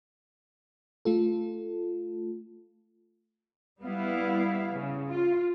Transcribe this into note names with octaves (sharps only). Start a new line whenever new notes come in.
A3 F4 A4
G3 B3 E4 F5
C#3
F4